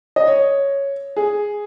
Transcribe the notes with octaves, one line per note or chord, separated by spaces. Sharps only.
D#5
C#5
G#4